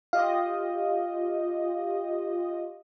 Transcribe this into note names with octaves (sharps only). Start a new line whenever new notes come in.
F4 G4 D#5 F5